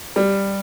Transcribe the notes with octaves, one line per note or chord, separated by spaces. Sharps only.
G3